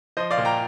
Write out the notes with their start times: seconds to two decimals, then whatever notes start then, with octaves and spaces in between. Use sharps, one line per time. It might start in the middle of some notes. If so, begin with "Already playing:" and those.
0.17 F3 C5 D#5
0.31 D5 F5
0.38 A#2
0.45 G5 A#5